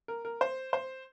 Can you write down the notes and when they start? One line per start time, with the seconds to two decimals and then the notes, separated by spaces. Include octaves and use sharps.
0.08 A#4
0.25 A#4
0.41 C5
0.73 C5